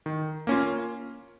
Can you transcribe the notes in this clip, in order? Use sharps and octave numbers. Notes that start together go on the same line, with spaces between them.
D#3
A#3 C#4 F4